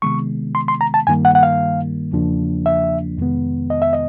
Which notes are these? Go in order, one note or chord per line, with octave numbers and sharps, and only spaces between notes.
C3 D#3 G#3 B3 C#6
C6
C6
A#5
A5
G2 D#3 G3 A#3 G#5
F#5
F#5
F5
E2 C#3 F3 A#3 D4
E5
F2 C3 D#3 G#3 B3
D#5
E5
D#5